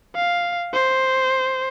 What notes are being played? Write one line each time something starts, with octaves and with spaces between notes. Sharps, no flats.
F5
C5